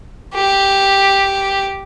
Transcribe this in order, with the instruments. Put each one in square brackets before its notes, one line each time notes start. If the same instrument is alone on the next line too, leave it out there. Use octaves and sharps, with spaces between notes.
[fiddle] G4